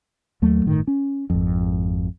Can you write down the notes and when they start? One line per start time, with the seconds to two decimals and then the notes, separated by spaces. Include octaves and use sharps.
0.42 D#2 F#3 A3
0.65 G1 A2 D#3
0.87 C#4
1.30 G#1 F2